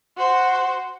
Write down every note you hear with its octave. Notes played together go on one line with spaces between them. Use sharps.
F#4 C5